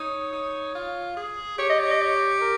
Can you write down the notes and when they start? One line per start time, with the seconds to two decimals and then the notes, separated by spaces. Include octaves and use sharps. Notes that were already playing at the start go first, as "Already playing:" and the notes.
Already playing: D#4 C#5
0.33 D#4
0.75 F4
1.17 G#4
1.58 G4 C#5
1.69 D#5
1.80 C#5
1.90 D#5
2.01 C#5
2.41 A#4